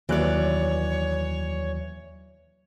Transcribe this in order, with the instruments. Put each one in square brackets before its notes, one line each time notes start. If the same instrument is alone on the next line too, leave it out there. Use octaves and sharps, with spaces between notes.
[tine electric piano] D#2 F#3 F#6 [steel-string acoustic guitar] E3 D5 [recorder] C#5